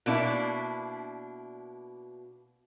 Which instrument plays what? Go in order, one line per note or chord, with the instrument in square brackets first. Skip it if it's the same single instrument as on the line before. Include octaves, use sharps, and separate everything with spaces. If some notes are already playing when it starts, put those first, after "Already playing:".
[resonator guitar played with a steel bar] B2 A#3 D4 E4